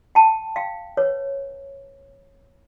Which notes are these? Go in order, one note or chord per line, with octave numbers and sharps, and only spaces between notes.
G5 A5
F5 G5
B4 C#5